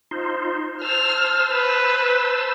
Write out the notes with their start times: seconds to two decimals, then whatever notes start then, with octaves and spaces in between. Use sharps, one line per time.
0.11 D#4 F4 C5
0.82 C5 A5 E6 F6
1.51 B4